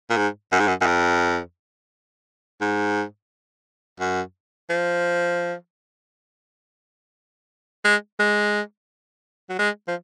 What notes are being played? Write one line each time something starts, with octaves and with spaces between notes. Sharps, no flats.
A#2
G#2
F#2
G#2
F#2
F#2
F2
G#2
F#2
F3
G#3
G#3
F#3
G#3
F3